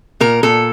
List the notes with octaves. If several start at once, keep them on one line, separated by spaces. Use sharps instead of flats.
A#2 A#4
A#2 A4